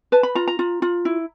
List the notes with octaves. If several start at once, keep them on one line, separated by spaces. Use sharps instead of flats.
B4 A5
B5
F4 A#5
A#5
F4
F4
E4